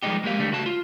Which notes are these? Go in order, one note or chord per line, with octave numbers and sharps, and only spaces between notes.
F3 G3 G#3 D4 D#4 G4
G#3 A#3 G4 F5
D3 G3 A3
C#2 F#4 A5
F4